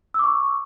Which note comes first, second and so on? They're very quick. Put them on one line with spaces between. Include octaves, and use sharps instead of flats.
E6 D6 C#6